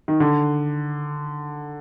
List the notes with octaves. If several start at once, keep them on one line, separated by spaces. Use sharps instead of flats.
D#3
D3